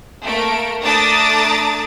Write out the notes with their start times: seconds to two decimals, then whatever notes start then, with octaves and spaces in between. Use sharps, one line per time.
0.24 A3 A#3 A#4 D7
0.83 A3 D4 A#5 D6 D#6 A6